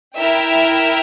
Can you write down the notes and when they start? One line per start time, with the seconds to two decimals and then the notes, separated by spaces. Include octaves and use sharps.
0.15 E4 A#4 E5 G5